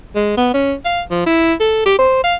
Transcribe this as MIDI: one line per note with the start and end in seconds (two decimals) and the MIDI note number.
0.15 0.33 56
0.37 0.50 59
0.54 0.73 61
0.85 1.01 77
1.11 1.23 53
1.26 1.53 64
1.60 1.84 69
1.85 1.95 67
1.99 2.22 72
2.24 2.35 77